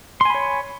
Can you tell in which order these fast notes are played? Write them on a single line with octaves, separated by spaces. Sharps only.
C6 G#5 B5 C#5